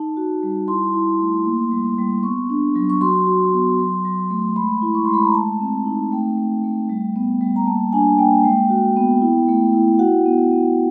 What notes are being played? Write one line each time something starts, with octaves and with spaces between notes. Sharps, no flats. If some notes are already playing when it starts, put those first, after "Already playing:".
Already playing: D#4 A5
F#4
G3
E4 C6
E4
A3
A#3
G3
G3
B3 C#6
D4
F#3
C#6
F#4 C6
F#4
B3
F#3
F#3
A3
G#3 B5
E4
C#6
G#3 C6
B5
A#5
A3 A5
C4
D#4
A3 G5
A3
A3
G3
B3
G3
A#5
A#3 A5
D4 G#5
A#3 G5
G#3 G5
F#4
B3
E4
A3
E4
F#4 F#5
B3
B3